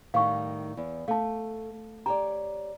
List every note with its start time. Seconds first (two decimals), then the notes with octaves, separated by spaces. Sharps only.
0.14 A2 D#3 G3 F5 C#6
0.77 E2
1.08 A3 F5 A5
2.06 G4 C#5 D5 A#5